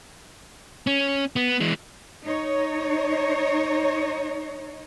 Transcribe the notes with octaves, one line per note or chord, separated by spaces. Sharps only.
C#4
B3
E3 G#3
D#4 C#5